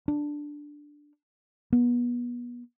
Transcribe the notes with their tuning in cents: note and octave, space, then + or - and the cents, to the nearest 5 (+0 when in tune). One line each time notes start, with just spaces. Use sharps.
D4 +0
B3 -30